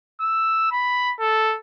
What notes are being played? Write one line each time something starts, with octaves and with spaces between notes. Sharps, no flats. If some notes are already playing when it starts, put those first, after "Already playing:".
E6
B5
A4